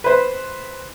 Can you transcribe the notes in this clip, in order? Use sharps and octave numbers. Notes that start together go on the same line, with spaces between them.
B4 C5